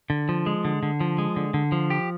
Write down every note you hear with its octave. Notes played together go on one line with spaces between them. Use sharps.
D3
F3
G#3
D3
D3
F3
G#3
D3
D3
F3
G4